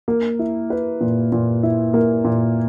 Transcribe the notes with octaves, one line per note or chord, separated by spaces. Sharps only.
A#3
E4
B4
A#2
A#2
E4
A#3
A#2